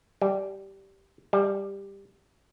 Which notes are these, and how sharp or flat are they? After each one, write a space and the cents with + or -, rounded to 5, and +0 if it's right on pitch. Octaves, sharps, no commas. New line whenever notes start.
G3 -10
G3 +10